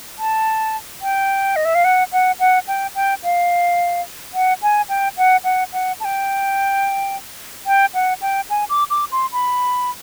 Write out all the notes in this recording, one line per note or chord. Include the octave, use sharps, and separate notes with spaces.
A5
G5
D#5
E5
F5
F#5
F#5
F#5
G5
G5
F5
F#5
G#5
G5
F#5
F#5
F#5
A5
G5
G5
F#5
G5
G#5
D6
D6
C6
B5